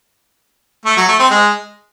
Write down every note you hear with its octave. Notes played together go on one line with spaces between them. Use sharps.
A3
F#3
A3
C4
G#3